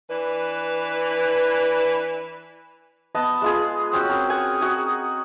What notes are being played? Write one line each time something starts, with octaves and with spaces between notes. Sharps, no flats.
E3 D4 B4
B3 D#5 A5
G#3 F4 G#4
C4 C#4 F#4
A#4
F#5 G#5 D#6
F#4 G#4